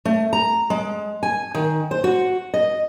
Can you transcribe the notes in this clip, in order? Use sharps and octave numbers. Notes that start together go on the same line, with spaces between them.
A3
A#5
G#3
G#5
D#3
C5
F#4
D#5